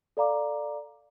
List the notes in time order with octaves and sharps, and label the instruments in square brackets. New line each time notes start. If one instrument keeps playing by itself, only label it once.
[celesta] A4 D5 F5 A#5 D6